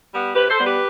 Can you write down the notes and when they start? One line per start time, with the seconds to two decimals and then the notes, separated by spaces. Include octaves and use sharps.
0.12 G3 B3
0.35 C3 G4 B4
0.50 A4 C5
0.58 G3 B3
0.66 G4 B4